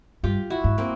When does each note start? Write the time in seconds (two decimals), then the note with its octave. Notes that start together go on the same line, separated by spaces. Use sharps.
0.23 G2 F4 G4
0.50 E4 F#4
0.64 G#2
0.78 A#3 C4